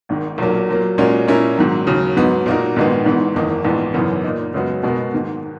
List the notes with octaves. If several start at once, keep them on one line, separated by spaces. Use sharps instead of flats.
G#1 G#2 D#3
B1 A#2 F#3 A#3
A#2 F#3 A#3
A#2 G#3 C#4 F#4 A#4
A#2 G#3 C#4 E4 A#4
G#2 D#3 F#3
D#2 C#3 F#3
G#2 F#3 B3 D#4
A#2 A#3 D#4 F#4 A#4
A#1 G#2 D#3 G#3 B3
G#1 G#2 E3 B3
F#1 E2 D#3 A#3 D#4
A#1 G#2 E3 B3
G#1 F#2 C#3 E3 B3
A#2 A#3 D#4
F#2 C#3 G#3 B3 F#4
B2 G#3 B3 F#4 A#4
G#2 D#3 A#3